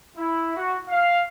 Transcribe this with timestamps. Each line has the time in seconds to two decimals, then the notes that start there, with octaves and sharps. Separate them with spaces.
0.17 E4
0.56 F#4
0.89 F5